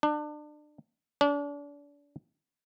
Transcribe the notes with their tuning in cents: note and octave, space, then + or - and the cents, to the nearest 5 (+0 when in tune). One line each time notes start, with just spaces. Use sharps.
D4 +30
D4 -35